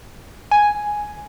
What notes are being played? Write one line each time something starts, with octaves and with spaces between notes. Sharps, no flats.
G#5